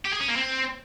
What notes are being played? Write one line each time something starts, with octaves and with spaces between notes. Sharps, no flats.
G4
G#4
C#4
A#3
C4